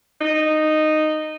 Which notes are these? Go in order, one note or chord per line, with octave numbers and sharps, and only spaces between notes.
D#4